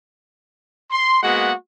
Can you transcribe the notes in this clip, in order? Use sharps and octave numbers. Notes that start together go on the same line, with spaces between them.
C6
G#3 A#3 B3 F#4 F#5